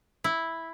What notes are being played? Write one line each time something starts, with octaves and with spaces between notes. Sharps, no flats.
E4